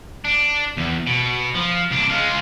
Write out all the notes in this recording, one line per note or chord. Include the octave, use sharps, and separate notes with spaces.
D4
E2
B2
F3
C2 D4
G#3 F4